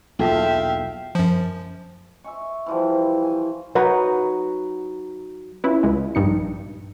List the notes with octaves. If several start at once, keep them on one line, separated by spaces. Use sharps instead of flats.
B1 E2 A#3 F4 A4 E5 F5 G5
F#2 F3
E5 G#5 C#6
E3 F3 G3
G#5
F#3 D#4 B4
C#4 E4 F4 B4
C#2 G#3
A#1 G2 D#4 C#7